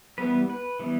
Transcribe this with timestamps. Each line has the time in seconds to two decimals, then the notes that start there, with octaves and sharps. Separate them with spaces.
0.18 E3 G3 B3 B4
0.50 B4
0.79 E3 G3 B3